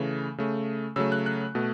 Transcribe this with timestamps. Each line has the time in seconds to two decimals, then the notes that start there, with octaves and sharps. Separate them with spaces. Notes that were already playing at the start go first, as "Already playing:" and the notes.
Already playing: C#3 E3 A3
0.38 C#3 A3
0.96 C#3 F#3 A3 E6
1.12 F#6
1.26 F#6
1.55 B2 A3